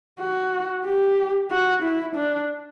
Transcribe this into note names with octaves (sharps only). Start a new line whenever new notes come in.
F#4
G4
F#4
E4
D4